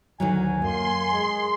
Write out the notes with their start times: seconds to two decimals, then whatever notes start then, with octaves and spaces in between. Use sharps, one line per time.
0.20 D2 D#3 F#3 G#5
0.62 F#2 A#3 C6
1.12 G#3